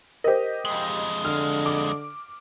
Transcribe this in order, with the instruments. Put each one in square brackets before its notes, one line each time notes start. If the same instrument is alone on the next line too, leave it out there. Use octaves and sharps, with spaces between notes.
[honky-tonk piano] G4 D#5 [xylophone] A#4 C5
[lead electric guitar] F2 G#3 [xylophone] F#7
[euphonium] D3 [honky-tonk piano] F6
[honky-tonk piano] D6